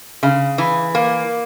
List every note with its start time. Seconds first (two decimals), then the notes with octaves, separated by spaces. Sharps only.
0.23 C#3
0.58 E3
0.95 A#3